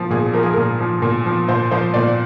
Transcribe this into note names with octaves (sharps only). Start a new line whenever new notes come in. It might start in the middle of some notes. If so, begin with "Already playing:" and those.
Already playing: A#2 F3
A#2 G#4
F3 A#4
G#4
A#2 A#4
F3
A#2
F3
A#2 C5
F3 C5
A#2 D5